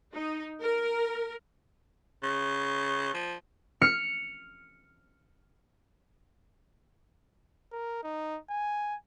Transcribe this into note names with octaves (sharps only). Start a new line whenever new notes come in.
D#4
A#4
C#3
F3
F6 C#7
A#4
D#4
G#5